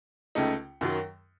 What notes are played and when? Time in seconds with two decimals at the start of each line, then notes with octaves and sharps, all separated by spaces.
0.35 C#2 C#3 A3 D#4
0.81 F#2 D#3 F#3